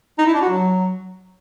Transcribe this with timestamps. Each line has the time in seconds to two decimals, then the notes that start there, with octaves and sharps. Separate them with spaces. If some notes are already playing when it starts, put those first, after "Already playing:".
0.18 D#4
0.26 E4
0.34 D4
0.42 F#4
0.49 F#3